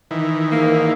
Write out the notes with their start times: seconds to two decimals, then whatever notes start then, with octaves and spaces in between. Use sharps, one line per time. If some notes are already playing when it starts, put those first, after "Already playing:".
0.11 D#3 E3
0.52 G#2 A#3